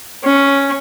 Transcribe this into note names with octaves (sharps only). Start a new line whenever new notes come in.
C#4